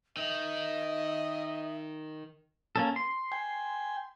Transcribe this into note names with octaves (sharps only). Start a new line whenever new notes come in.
D#3 D#5 E5
A#3 C#4 A4
C6
G5 G#5